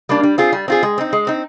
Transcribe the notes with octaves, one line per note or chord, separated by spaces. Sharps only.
G3 A#3 D4
G3
C4 F4 G#4
G3
C4 F4 G#4
G#3
C4 D#4
G#3
C4 D#4